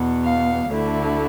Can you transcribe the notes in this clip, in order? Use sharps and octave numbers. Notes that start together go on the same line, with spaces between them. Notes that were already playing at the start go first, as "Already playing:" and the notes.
Already playing: E2 B2 B3
F5
D2 D3 A3 E4